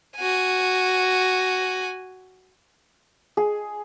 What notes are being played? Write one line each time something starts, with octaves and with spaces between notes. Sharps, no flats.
F#4 G#5
G#4